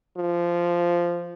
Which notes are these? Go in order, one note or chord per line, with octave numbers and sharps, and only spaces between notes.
F3